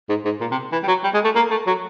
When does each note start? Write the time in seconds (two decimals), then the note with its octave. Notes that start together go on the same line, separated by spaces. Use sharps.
0.09 G#2
0.25 G#2
0.41 A#2
0.51 C3
0.72 E3
0.83 G3
0.88 F#3
1.04 G3
1.14 G#3
1.25 A3
1.35 A#3
1.51 A3
1.67 F#3